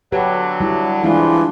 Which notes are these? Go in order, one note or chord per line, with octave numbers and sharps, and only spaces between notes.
D3 F#3 G4 B4
G3 E4
G2 C3 E3 F3 G#3 D4 F4